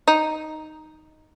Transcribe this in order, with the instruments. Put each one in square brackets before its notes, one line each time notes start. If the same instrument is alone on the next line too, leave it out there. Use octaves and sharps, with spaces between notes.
[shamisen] D#4